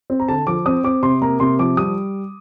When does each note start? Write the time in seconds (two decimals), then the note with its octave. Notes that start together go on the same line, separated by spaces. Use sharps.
0.10 C4
0.20 A#5
0.28 D3 A5
0.47 F3 D6
0.66 C4 D#6
0.84 C4 D6
1.03 C3 C6
1.22 A#3 A#5
1.40 C3 C6
1.59 F3 D6
1.77 G3 D#6